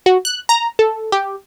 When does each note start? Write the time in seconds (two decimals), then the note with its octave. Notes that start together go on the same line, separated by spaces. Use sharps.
0.06 F#4
0.25 F#6
0.49 A#5
0.79 A4
1.12 G4